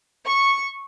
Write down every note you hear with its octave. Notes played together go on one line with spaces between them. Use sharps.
C#6